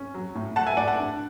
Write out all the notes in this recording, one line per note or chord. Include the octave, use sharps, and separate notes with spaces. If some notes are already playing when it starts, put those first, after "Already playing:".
Already playing: C#4
F#3
A2
A3 F#5 A5
E5 G#5
A2 D5 F#5
F#5 A5
D4